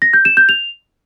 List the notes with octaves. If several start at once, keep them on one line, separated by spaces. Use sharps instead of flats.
A#6
G6
E7
G6
F7